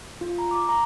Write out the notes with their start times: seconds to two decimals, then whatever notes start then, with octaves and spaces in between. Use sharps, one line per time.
0.21 F4
0.39 A#5
0.51 D6
0.69 A#5